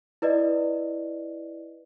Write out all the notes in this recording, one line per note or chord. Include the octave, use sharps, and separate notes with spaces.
E4 B4 D5 D#5